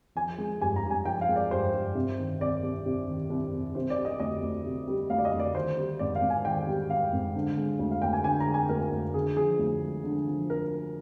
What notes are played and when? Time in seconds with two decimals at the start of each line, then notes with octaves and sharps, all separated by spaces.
0.15 F3 G#5
0.38 G#3
0.61 G2 G#5
0.76 A#5
0.84 G2
0.91 G#5
1.05 F3 G5
1.21 F5
1.29 G#3
1.36 D5
1.51 G2 C5
1.74 G2
1.95 C3
2.18 D#3
2.41 C2 D5
2.63 C2
2.86 C3
3.08 D#3
3.30 C2
3.53 C2
3.75 C3 C5
3.90 D5
3.98 G3
4.05 D#5
4.20 D2 D#5
4.43 D2
4.66 C3
4.88 G3
5.10 D2 F5
5.18 D5
5.25 D#5
5.33 D2
5.40 D5
5.55 D#3 C5
5.77 G3
5.99 G#2 D5
6.15 F5
6.22 G#2
6.30 G#5
6.45 D#3 G5
6.67 G3
6.89 G#2 F5
7.13 G#2
7.35 D3
7.57 G#3
7.79 D2
7.91 F5
8.02 D2 G5
8.13 G#5
8.24 D3 G#5
8.40 A#5
8.47 G#3
8.54 G#5
8.69 D2 A#4
8.92 D2
9.14 D3 G#4
9.37 F3 G#4
9.59 D2
9.82 G#3
10.04 D3
10.27 F3
10.50 A#4